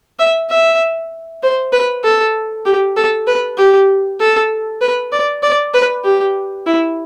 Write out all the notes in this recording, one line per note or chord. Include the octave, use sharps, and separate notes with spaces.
E5
E5
C5
B4
A4
G4
A4
B4
G4
A4
B4
D5
D5
B4
G4
E4